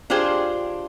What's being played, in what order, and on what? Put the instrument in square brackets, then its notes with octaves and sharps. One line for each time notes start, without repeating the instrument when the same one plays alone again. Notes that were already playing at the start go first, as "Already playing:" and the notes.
[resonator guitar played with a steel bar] D4 F4 G4 G#4 C5